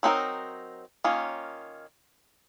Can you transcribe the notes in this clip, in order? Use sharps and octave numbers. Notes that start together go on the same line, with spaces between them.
F#3 C4 D#4 F#4 A#4
D#3 A#3 C#4 F4